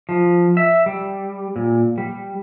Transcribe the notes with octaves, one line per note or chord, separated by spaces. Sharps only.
F3
E5
G3
A#2
G3